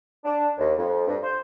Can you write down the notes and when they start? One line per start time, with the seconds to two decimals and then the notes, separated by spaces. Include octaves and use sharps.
0.24 D4
0.58 D#2
0.78 F2
1.07 G2
1.22 C5